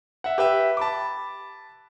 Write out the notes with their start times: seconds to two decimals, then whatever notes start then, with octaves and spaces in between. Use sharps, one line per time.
0.24 E5 F#5
0.38 G4 B4 E5
0.77 A5 B5 D6